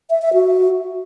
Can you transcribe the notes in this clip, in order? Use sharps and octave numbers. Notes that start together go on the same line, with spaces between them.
E5
E5
F#4